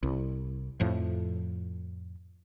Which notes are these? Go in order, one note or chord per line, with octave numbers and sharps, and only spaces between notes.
C2
F2 A2 F3